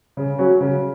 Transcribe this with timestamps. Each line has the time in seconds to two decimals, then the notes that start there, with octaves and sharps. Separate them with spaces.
0.17 C#3
0.38 F#3 C#4 F#4
0.60 C#3